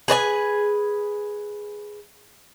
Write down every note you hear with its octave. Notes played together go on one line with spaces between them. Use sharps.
G#4 B4 D5 G#5